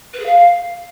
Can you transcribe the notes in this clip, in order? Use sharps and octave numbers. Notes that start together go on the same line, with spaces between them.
B4
G#4
F5